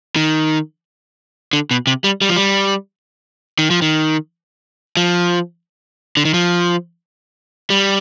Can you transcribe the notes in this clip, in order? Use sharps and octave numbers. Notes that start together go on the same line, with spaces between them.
D#3
D3
B2
C3
G3
G3
F3
G3
D#3
F3
D#3
F3
D3
D#3
F3
G3